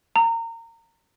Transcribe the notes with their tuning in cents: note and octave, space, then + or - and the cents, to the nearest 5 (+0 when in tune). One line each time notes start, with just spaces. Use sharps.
A#5 -25